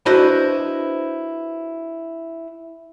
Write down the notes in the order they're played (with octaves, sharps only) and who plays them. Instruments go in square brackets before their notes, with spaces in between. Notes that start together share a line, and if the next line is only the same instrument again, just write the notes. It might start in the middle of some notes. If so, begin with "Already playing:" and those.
[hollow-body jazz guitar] D4 E4 F#4 B4 C5 D#5